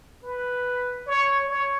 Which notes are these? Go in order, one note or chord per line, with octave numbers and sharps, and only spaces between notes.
B4
C#5
C#5